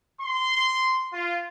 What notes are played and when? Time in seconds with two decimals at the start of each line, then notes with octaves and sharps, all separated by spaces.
0.20 C6
1.13 F4